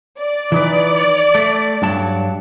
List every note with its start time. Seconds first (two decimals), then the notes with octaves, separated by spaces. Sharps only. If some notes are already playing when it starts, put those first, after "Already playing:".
0.20 D5
0.52 E3 D#4 B4
1.35 A3
1.82 G2 F#3 A5